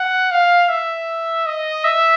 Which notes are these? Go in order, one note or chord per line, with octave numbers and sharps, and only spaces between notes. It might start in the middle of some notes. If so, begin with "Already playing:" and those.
Already playing: F#5
F5
E5
D#5
E5